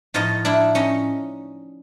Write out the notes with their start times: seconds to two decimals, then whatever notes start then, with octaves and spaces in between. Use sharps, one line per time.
0.14 A2 F3 D#4 F4
0.45 D4 E4
0.75 C#4 D#4